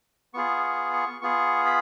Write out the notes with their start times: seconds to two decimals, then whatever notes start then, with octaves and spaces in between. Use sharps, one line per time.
0.34 B3 F4 G#4 C#6
0.64 C#6
0.93 C#6
1.21 B3 F4 G#4 C#6
1.66 B5